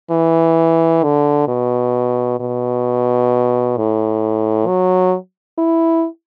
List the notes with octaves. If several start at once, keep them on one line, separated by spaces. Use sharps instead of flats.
E3
D3
B2
B2
A2
F#3
E4